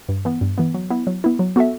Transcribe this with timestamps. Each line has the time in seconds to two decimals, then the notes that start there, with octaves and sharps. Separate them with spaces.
0.09 G2
0.25 E3 B3
0.41 G2
0.58 E3 B3
0.74 F#3
0.90 B3 E4
1.07 F#3
1.24 B3 E4
1.39 F#3
1.56 B3 F#4 A4 E5